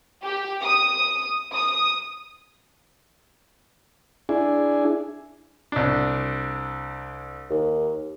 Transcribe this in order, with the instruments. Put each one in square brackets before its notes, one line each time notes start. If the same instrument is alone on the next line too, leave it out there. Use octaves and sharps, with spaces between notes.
[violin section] G4
D#6
D#6
[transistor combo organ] D4 E4 G#4
[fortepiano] C2 D4
[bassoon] D#2